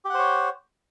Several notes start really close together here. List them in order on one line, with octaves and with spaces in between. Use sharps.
G4 F#5 C5 C#5